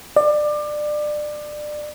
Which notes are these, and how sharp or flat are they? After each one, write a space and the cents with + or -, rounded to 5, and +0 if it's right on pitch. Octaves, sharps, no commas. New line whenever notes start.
D5 +25